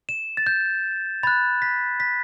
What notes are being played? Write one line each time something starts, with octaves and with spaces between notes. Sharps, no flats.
E7
A6
G6
B5 F#6 A6
B6
B6